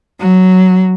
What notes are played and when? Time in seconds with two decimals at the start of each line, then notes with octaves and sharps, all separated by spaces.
0.21 F#3